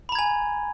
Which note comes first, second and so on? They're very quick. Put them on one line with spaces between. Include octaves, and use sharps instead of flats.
B5 A#5 G#6 G#5